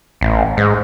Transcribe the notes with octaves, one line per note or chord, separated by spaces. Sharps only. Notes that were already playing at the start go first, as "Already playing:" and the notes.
A1
G#2